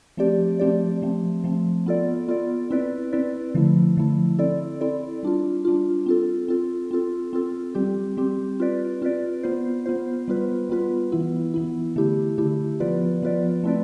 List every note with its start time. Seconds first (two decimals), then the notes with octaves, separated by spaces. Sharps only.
0.17 F3 A3 C4 G4 D5
0.59 F3 A3 C4 G4 D5
1.02 F3 A3 C4
1.44 F3 A3 C4
1.86 B3 F4 A4 D5
2.28 B3 F4 A4 D5
2.70 C4 E4 B4 D5
3.13 C4 E4 B4 D5
3.54 D3 F3 A3 E4
3.97 D3 F3 A3 E4
4.39 C4 E4 A4 D5
4.81 C4 E4 A4 D5
5.23 G3 D4 F4
5.65 G3 D4 F4
6.06 C4 F4 A4
6.48 C4 F4 A4
6.91 C4 F4 A4
7.33 C4 F4 A4
7.75 G3 C4 G4
8.17 G3 C4 G4
8.60 C4 F4 B4 D5
9.02 C4 F4 B4 D5
9.43 B3 F4 C5
9.86 B3 F4 C5
10.28 G3 B3 F4 B4
10.69 G3 B3 F4 B4
11.12 E3 B3 E4
11.54 E3 B3 E4
11.96 D3 A3 E4 G4
12.38 D3 A3 E4 G4
12.80 F3 B3 F4 B4 D5
13.22 F3 B3 F4 B4 D5
13.64 A3 C4 E4 B4 D5